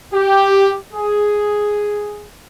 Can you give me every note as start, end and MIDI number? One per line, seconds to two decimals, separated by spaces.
0.14 0.75 67
0.93 2.31 68